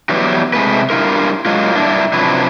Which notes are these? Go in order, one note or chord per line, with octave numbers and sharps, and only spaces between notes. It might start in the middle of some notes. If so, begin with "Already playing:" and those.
E3 F#3 G3 B3
C3 G#3 A3 B4
G2 G#3 E4 F4 A#4
F#3 G#3 A#3 F4
G2 D4 E4
C3 F3 F#3 D4 E4 B4